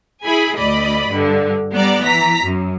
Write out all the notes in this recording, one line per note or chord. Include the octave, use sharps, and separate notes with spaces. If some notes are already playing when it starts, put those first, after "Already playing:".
E4 G#4 G#5 B5
D2 D5 D#5 B5
G2 D3
G3 B3 D5 A#5
E3 A#5 B6
F#2